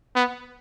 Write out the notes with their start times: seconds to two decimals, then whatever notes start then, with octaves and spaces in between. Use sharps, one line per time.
0.15 B3